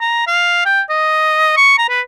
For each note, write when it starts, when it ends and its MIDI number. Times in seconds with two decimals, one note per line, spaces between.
0.01 0.27 82
0.27 0.62 77
0.65 0.81 79
0.89 1.55 75
1.57 1.76 85
1.78 1.88 82
1.89 2.01 71